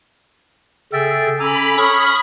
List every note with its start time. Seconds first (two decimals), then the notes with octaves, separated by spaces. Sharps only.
0.93 C#3 G#4 A4 E5 G5 A6
1.40 C#4 A4 G#5 A#5 B5 D6
1.78 C#5 B5 C#6 D#6 F6